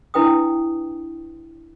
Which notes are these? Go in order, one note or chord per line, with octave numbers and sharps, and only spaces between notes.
D4 E4 B4 G5 D#6